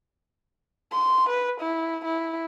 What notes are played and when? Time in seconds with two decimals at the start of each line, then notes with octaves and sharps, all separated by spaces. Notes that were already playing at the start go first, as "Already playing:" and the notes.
0.92 C6
1.30 B4
1.61 E4
2.05 E4